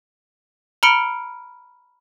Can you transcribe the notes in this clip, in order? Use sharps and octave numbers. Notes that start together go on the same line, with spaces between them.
A#5 B5 F6 C#7 D7 G7